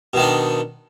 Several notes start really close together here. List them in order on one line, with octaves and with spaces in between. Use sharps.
B2 D#3 D#4 D4